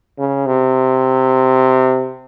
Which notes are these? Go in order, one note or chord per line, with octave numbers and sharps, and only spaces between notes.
C#3
C3